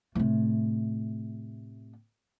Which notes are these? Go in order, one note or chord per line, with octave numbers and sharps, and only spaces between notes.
A2 C3